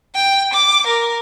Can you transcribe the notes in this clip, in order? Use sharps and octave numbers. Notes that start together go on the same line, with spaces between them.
G5
D6
A#4